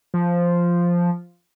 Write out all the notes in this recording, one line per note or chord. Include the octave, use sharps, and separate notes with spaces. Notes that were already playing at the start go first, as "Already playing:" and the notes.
F3